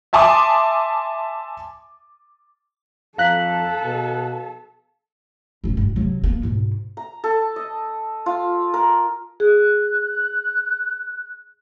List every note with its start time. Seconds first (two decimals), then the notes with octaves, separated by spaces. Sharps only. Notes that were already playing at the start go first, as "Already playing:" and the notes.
0.13 E5 G#5 A5 C6 D6 D#6
3.18 F2 A4 F5 A5 A#5 F#6 B6 F#7
3.84 B2
5.64 D#1 A#1
5.77 G2 B2
5.96 C3 F#3
6.24 A#3 B3
6.43 G#2 B2
6.97 A#5
7.24 A4
7.56 D#5
8.26 F4
8.74 A#4
9.40 G#4 F#6